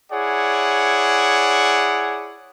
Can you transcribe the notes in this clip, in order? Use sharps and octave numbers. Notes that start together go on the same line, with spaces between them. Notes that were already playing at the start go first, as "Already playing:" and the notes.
E4 G#4 C#5 D5 F#5